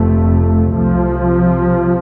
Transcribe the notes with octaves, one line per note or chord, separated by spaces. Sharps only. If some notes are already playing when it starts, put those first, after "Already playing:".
Already playing: F1 F2 C3 A3
C2 C3 F3